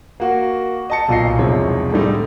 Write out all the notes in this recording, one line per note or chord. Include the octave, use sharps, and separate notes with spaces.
A#3 F#4
D#5 A5 C#7
B1 A#2 F4 D#5 C7
E1 C2 F3 D#4 C#5
A2 D3 G3 G#3 D#4